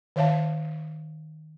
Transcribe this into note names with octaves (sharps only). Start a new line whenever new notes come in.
D#3 C#5 E5 F5 A5